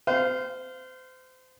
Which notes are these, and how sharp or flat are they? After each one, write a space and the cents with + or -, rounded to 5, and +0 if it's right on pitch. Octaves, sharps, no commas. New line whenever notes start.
C5 -30 F5 +0